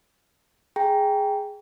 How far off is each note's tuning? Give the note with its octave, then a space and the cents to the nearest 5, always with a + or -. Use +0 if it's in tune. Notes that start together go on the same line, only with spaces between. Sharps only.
G#4 +0 G5 +0 A#5 +0